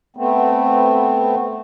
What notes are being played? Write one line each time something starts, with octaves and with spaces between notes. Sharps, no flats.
A3 B3 C4